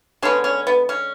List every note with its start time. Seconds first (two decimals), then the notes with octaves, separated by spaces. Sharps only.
0.22 D3 G#3 B3 C#4
0.44 C#4
0.67 B3
0.89 C#4